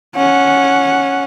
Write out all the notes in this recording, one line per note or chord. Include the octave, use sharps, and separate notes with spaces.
C#4 F#5